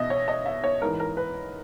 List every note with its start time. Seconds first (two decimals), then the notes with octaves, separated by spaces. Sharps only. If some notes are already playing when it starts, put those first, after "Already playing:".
Already playing: E2 B2 D#5 E5
0.10 C#5
0.28 D#5
0.46 E5
0.64 C#5
0.81 G#2 E3 A#4
1.00 A#4
1.17 B4